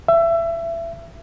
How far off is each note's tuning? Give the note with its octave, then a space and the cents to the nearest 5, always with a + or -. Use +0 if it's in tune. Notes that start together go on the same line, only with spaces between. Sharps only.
E5 +25